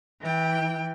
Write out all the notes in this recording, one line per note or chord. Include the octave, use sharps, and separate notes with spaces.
E3 G5